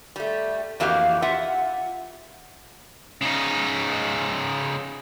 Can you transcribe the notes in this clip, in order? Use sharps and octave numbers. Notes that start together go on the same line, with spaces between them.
G3 A3
F2 E3 A#3 F#4 G4 F5
F4 E5 F#5
C#3 D#4